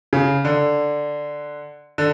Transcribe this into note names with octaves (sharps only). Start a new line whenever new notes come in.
C#3
D3
D3